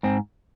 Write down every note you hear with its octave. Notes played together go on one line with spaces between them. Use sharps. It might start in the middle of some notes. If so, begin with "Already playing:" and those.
G#2 C4